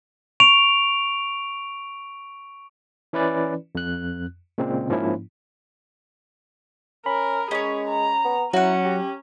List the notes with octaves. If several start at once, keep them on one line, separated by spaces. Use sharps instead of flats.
C#6 D7 F7
E3 C#4 E4 B4 D5
F2 F#6
A#2 C#3 G#3 C4
G#2 F3 A#3 C#4 E4
C#4 A#4 B5
G#3 C#4 G#4 C#5
A#5
B3
F#3 C#4 E4 F#4 F#5
G4